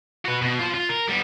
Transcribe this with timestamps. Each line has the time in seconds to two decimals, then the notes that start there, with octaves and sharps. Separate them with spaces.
0.25 F#4 B4
0.42 B2
0.59 F4 C5
0.74 F4
0.89 A#4
1.08 G3 B3